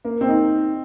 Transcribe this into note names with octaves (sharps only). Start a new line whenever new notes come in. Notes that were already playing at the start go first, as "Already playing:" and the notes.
A#3
C4
D#4